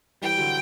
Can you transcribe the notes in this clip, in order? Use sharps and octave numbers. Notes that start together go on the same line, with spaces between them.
E3 G3 G5
D3 F#3